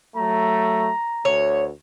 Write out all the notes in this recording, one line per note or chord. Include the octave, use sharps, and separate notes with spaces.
F#3 A3 A#5
D2 C#5